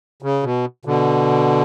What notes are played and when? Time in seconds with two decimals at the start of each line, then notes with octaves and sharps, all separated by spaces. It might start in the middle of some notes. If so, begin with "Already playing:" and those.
0.23 C#3
0.43 B2
0.85 B2 D3